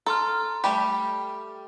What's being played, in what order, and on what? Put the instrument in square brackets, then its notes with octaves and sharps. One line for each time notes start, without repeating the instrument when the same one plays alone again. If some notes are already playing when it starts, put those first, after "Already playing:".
[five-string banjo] A4 [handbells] A#5 C6 F6
[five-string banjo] G3 A3 G4 [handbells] B5